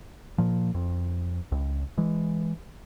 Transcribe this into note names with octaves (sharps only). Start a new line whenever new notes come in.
A#2 F3
F2
C#2
E3 G#3